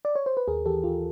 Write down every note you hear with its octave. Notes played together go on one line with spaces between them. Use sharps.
D5
C#5
C5
B4
D#2 G#4 A#4
E3 G4 A4
D#2 F4 G4